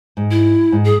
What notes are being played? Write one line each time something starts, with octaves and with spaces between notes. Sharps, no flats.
G#2
E4
G#2
G#4